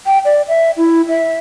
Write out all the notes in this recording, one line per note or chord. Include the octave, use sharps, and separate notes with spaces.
G5
D5
E5
E4
E5